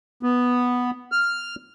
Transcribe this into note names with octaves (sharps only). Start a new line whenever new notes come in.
B3
F6